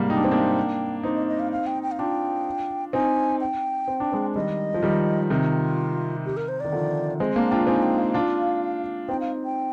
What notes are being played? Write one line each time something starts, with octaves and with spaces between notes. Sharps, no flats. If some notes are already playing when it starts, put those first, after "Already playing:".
Already playing: G#2 C3 G3 A#3
D#4 G5
D4
C4
A#3 D4
C4 D#4
D#5
D#5
F5
F5
G5
G5
F5
D4 F4 G5
C4 D#4 G#5
G5
C4
D4
G#3 C4
D#3 G3 D#5
F3
D#3 G3
C3 D#3 F4
G4
A#4
C5
D#3 D5
D3 F3
G#3 C4 D#5
A#3 D4 F5
D4 F4 G5
C4 D#4 G#5
G5
F5
D4 F4
C4 D#4 G5
F5
G5